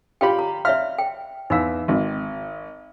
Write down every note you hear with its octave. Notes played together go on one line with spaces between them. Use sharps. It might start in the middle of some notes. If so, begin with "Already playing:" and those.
F4 G4 D5 G5 B5
A#5
D5 E5 F5 F6
G5
E2 D#4 F5 E6
G#1